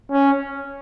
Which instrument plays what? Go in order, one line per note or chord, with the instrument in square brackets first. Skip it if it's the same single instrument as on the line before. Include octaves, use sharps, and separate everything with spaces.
[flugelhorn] C#4